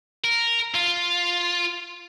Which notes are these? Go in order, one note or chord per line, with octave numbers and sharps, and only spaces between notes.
A#4
F4